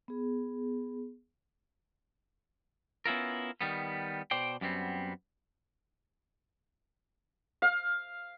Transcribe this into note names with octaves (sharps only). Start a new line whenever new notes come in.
B3 G#4
B3 C#4 E4 F4 A#4
D#3 G3 B3
B2 C5 D5 G5
F#2 G3 B3 C4
F5